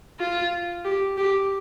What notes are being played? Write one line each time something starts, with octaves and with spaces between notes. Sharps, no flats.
F4
G4
G4